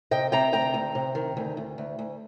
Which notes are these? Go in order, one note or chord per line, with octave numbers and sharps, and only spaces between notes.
C3 D#5 G5
C3 G5 A#5
D2 G5 A#5
D2
C3
D#3
D2
D2
D2
D2